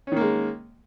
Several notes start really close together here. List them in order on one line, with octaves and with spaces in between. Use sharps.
C#4 D#3 A#3 G#3